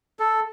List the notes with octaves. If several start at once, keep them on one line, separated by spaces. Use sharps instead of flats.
A4